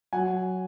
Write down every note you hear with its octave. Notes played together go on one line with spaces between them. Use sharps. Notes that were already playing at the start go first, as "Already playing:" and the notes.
F#3 F#5 G#5